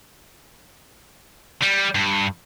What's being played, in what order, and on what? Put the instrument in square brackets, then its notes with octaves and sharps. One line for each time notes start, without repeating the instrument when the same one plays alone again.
[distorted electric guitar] G3
G2